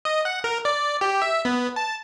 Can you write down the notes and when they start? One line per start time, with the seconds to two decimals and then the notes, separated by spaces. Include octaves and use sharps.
0.05 D#5
0.25 F#5
0.44 A#4
0.65 D5
1.01 G4
1.22 E5
1.45 B3
1.76 A5